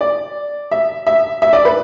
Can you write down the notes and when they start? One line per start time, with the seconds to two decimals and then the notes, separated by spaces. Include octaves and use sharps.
0.01 D5
0.71 E5
1.07 E5
1.42 E5
1.53 D5
1.65 B4